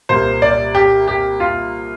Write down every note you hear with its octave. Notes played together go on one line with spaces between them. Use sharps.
C2 A#2 A#3 C5
D5
G4
G4
F4